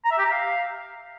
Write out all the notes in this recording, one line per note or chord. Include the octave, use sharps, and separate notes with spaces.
A#5
E5
G4
A#5
F5